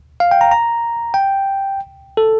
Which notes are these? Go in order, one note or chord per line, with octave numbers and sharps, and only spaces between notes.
F5
G5
A#5
A#5
G5
A4